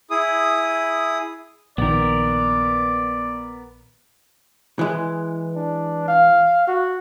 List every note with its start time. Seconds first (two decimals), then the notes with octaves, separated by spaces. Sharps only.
0.10 E4 G#4 D#6
1.78 A#1 D#3 B3 A#4 D5
4.79 E3 G#3
5.56 D4
6.08 F5
6.67 F#4